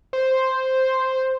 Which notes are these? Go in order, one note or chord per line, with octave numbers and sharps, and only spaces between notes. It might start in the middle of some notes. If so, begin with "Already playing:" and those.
C5